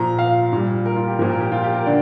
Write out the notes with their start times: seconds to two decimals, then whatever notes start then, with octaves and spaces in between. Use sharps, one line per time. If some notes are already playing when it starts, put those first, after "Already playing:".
Already playing: A#2 F3 A#5
0.19 F5
0.53 A#2 G3
0.86 A#4
0.96 F4
1.07 G4
1.19 F3 A#4
1.22 A#2
1.30 A#4
1.41 G4
1.52 F4
1.64 G4
1.74 A#4
1.86 D3 D5